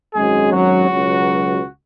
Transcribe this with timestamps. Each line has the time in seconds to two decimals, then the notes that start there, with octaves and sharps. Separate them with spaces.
0.15 G#1 F#2 F#3 G#3 G#4
0.52 F#3 F#4
0.88 C#2 B2 F#3